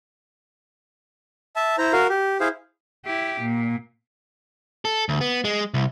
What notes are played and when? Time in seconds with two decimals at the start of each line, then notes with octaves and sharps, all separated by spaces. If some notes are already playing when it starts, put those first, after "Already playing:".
1.56 E5 A5
1.78 E4 C5 A#5
1.93 F#4 A#4 F5
2.09 G4
2.40 E4 G#4 C5 F5
3.05 E4 G4
3.41 A#2
4.85 A4
5.09 D2
5.21 B3
5.44 G#3
5.74 C2